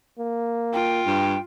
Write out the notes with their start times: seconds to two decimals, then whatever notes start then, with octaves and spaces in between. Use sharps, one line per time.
0.19 A#3
0.73 F4 G5
1.06 G2